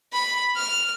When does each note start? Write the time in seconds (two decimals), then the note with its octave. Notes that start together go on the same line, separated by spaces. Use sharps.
0.13 B5
0.56 F6